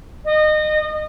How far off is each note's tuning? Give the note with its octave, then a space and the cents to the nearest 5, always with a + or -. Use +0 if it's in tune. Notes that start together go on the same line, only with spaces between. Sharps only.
D#5 -25